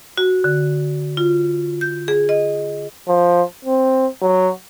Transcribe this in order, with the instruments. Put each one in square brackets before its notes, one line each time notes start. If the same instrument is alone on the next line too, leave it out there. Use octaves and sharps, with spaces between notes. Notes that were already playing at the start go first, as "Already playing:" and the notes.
[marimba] F#4
D3
F4
G6
G#4
D#5
[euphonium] F3
C4
F#3